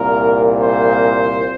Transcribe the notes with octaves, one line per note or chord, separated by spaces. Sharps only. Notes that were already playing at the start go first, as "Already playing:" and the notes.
Already playing: C2 A#2 A#4
C5